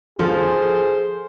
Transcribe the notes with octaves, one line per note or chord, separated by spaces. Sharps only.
F3 G#4 A4 C5